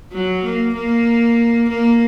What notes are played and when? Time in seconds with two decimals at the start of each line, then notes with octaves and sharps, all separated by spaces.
0.13 F#3
0.44 A#3
0.75 A#3
1.69 A#3